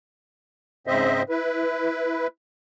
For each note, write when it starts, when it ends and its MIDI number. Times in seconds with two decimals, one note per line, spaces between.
0.87 1.22 44
0.87 1.22 49
0.87 1.22 60
0.87 1.22 72
0.87 1.22 75
0.87 1.22 76
1.29 2.27 64
1.29 2.27 71